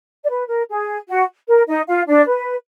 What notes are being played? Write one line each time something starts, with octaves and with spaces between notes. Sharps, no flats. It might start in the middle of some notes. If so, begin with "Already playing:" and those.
D5
B4
A#4
G#4
F#4
A#4
D#4 D#5
F4 F5
D4 D5
B4